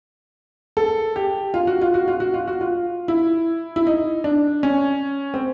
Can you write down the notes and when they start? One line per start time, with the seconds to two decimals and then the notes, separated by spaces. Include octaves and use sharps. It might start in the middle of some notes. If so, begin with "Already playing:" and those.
0.77 A4
1.16 G4
1.54 F4
1.67 F#4
1.82 F4
1.94 F#4
2.08 F4
2.20 F#4
2.34 F4
2.48 F#4
2.61 F4
3.08 E4
3.76 E4
3.87 D#4
4.24 D4
4.63 C#4
5.34 C4